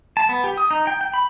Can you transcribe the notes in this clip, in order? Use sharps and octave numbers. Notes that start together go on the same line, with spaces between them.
A5
B3
G4
D#6
D#4
G5
G5
B5